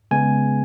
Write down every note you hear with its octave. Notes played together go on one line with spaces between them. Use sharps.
C#3 G#3 B3 G#5